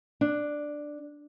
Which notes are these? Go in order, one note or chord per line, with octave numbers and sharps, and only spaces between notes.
D4